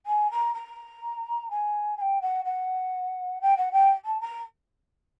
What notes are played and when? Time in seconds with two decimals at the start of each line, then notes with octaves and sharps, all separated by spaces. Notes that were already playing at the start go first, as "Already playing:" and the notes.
0.06 G#5
0.31 A#5
0.54 A#5
1.50 G#5
1.97 G#5
2.01 G5
2.21 F#5
2.45 F#5
3.41 G5
3.57 F#5
3.72 G5
4.05 A5
4.21 A#5